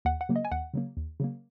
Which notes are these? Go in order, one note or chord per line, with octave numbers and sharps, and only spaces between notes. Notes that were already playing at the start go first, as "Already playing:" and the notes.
D#2 F#5
F#5
C#3 F#3 A#3
D#5
G#5
D#2 F#5
C#3 F#3 A#3
D#2
C#3 F#3 A#3